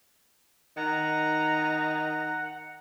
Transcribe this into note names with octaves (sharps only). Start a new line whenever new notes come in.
D#3 F#5 A#5